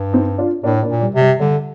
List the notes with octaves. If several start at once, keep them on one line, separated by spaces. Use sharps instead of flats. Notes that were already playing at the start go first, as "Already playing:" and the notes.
Already playing: G2
C4 D#4
D4 F4
A2 A#3 D4
A#3 D4
A#2
G3
C3
G3
D3 G3